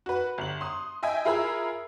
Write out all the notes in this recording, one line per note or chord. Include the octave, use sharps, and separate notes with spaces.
F#4 B4
G1 F#7
C6 D#6
D#5 E5 G5 G#5
E4 F4 G#4 A#4 B5 E6